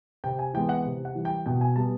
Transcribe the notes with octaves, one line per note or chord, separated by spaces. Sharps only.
C3 G5
G#5
E3 G#3 B3 G5
F#5
C3
F#5
E3 G3
G5
B2 G5
G#5
G3 B3 A5